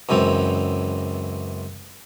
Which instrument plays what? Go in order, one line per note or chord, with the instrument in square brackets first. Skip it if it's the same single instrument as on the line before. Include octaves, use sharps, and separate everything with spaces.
[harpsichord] C#2 F#2 E3 C4